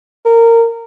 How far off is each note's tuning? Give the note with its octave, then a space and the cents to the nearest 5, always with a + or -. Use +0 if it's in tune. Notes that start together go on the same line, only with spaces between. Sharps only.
A#4 -20